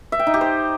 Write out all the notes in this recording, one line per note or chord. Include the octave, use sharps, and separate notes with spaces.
E5
G5
D#4
G4
C5